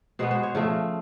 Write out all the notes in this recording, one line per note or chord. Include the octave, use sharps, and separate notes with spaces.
B2 G#3 B3 C5
C5
C#5
C#3 F3 A3 C5